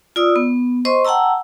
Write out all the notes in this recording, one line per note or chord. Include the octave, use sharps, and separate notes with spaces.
F4 D5 D#6 E6
B3
C5 D#5 C6 C#6
F#5 G5 A5 A#5 E6